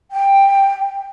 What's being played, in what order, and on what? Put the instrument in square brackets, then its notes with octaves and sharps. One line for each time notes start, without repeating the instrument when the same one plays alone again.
[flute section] G5